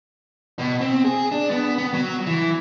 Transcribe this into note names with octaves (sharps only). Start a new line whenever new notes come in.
B2
C4
G#4
D4
B3
B3
F#3
E3